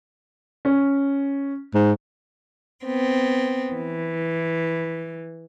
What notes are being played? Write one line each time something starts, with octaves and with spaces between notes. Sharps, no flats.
C#4
G#2
B3 C4
E3